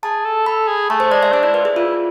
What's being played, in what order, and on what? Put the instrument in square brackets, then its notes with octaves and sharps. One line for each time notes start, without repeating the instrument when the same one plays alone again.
[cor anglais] G#4 [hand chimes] A5
[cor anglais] A4
[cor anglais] A4 [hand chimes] B5
[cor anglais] G#4
[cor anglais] A3 [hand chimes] A5
[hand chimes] C5
[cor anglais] G#3 [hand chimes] D5
[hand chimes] E5
[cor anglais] D4 [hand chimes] D5
[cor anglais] E4 [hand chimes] D5
[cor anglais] F4 [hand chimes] B4
[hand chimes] G#4
[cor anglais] E4 [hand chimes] F4